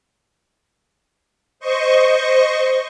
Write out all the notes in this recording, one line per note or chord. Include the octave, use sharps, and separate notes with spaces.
C5 D#5 C#6